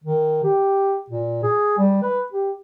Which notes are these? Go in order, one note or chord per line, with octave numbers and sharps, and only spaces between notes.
D#3
G4
A#2
G#4
G3
B4
G4